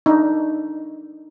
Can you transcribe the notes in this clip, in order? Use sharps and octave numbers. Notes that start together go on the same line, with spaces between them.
D4 D#4